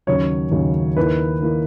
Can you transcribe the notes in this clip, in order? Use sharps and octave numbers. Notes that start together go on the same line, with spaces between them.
D#2 C#3 F#3 C#4 C#5
D#2 C#3 F#3 C#4
D#2 D#3 A#3 E4 B4
D#3 A#3 E4